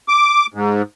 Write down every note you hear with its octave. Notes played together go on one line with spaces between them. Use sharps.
D6
G#2